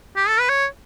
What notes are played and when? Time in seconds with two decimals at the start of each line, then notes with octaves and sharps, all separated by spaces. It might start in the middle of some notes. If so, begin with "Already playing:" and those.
0.16 G4
0.28 A4
0.39 B4
0.49 C#5